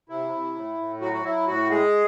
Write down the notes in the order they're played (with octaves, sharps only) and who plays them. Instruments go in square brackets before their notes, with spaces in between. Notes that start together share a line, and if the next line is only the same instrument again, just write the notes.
[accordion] C3 E4
C3
A2
A2
F#3 F#4
F#4
F#3 E4
A2 F#4
G#3 G#4